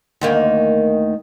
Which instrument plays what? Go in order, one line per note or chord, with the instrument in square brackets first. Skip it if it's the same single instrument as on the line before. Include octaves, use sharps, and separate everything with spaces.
[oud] D2 D#3 A#3